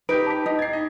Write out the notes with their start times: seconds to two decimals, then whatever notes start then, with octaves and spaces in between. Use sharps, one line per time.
0.09 D#4 G4 B4 G6 D7
0.26 A5 D6 B6
0.46 D#4
0.59 G#6 A6 C7
0.73 D#5